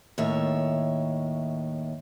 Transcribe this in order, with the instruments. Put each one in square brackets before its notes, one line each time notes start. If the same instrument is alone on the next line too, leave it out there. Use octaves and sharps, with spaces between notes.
[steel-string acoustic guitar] D#2 A2 C#5 E5